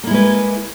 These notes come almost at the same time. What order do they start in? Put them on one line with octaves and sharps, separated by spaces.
A#3 E4 G#3 B4